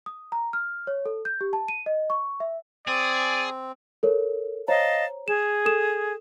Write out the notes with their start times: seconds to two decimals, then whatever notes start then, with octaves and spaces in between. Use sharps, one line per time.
0.06 D#6
0.32 A#5
0.53 F6
0.87 C#5
1.06 A4
1.25 G6
1.41 G4
1.53 A5
1.68 D#7
1.86 D#5
2.10 C#6
2.40 E5
2.87 C4 G#4 D5
4.03 A4 A#4 C#5
4.68 C5 C#5 D#5 F5 A5 A#5
5.28 G#4 E7
5.66 A4 D#6 E7